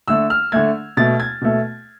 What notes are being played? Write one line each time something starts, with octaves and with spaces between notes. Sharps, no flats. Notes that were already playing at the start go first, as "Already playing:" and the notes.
D3 A3 E6
F6
D3 A3 G#6
B2 A3 A6
G#6
B2 A3